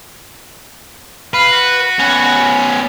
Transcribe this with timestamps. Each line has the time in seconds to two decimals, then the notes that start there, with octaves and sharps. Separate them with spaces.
1.34 B4 F5
1.52 F#4
1.99 B3 C#4